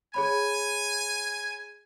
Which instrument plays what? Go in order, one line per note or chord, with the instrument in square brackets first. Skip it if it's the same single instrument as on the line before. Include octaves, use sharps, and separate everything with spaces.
[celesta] G#4 C#5 B5 [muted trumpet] G#5